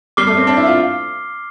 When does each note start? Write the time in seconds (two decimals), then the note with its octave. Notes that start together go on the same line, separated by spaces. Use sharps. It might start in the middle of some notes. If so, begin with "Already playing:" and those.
0.17 G3 D6 F6 C7 G7
0.27 A3
0.37 C4
0.47 D4
0.57 E4
0.66 F4